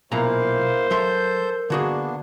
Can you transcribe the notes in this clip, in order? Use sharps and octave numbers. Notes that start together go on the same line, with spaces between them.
B1 A#2 A#3 E4 A#4 C5 F5 A#5
F#3 A4 E5 C6 G6
D3 A#3 B3 D4 F#4 G#4